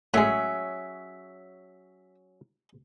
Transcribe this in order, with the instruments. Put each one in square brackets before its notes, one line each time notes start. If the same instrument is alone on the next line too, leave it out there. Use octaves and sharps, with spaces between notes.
[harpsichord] A2 G#3 [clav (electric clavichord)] F#3 C#4 G#4 [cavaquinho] E5